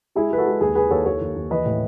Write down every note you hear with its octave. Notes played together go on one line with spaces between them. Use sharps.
G#3 E4 G#4
G#3 B4
F#4 A4
G#3
D#2 G#4 B4
D#2 G#4 B4
D#2 A4 C#5
D#2 A4 C#5
D#2
D#2
E3 B4 D#5
A2